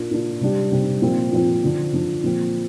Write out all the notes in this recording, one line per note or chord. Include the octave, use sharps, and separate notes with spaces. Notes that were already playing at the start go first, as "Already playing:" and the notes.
Already playing: A#2 A#3 D4 F4
A#2 A#3 D4 F4
C3 G3 D4 G4
C3 G3 D4 G4
A#2 F3 C4 F4
A#2 F3 C4 F4
D3 F3 D4
D3 F3 D4
A#2 F3 C4